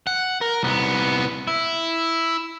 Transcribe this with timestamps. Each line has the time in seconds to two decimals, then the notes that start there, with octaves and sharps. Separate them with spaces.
0.07 F#5
0.41 A#4
0.63 C2 B3
1.47 E4